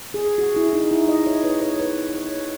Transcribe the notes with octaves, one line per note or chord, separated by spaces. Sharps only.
G#4
F#4
E4
D#4
E4
D#5
C#5
B4
C#5
B4
C#5